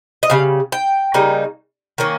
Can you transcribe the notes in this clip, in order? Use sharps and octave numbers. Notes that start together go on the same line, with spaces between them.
D#5
C#3 G3 F5
G5
C#3 G3 A#3 D#4
D#3 A#3 C#4